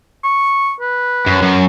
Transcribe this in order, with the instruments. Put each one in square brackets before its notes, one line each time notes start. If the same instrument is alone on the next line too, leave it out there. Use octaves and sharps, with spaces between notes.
[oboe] C#6
B4
[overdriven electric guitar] F#2
F#2